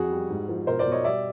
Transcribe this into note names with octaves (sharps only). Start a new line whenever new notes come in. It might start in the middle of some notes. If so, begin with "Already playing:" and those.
Already playing: F2 F#4 G#4
G3
G#2
F3
B2 A#4 C5
C5 D5
B2
C#5 D#5
G3 D5 E5